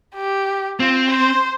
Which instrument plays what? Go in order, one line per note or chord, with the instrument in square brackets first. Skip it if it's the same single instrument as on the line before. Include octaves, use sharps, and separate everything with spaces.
[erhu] G4
[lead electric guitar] C4 [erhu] F4
[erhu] C5